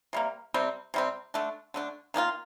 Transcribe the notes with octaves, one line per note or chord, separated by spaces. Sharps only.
C3 G3 A#3
C3 G3 C4
C3 G3 C4
D3 A3 D4
D3 A3 D4
D#3 A#3 D4 F4